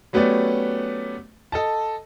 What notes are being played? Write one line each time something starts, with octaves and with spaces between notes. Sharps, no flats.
F#3 A3 B3 C#4 G4 D5
A4 D#5 A5